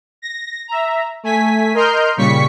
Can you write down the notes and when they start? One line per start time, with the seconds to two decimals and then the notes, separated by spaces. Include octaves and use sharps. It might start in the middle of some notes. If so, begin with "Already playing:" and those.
0.22 A#6
0.68 E5 A#5
1.23 A3 G#5 B6
1.74 A#4 D#5 C6 F6 G6
2.17 A#2 C#3 G3 C#6 B6 C#7